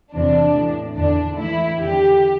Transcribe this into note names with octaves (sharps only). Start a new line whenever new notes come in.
E2 C3 E3 D4
A2 E3
E2 D3 D4
A2 E3 E4
E2 D3 G4